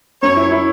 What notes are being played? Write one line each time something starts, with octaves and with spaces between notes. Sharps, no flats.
F#2 C#5
E4
E4